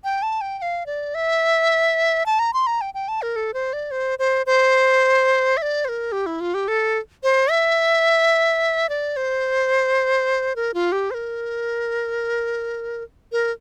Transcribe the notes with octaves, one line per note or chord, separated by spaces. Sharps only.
G5
A5
G5
G5
F5
D5
E5
A5
A#5
C6
A#5
G5
G5
A5
A#4
A4
C5
D5
C5
C5
C5
E5
D5
C5
A#4
G4
E4
F4
G4
A4
C5
E5
D5
C5
A#4
F4
G4
C5
A#4
A#4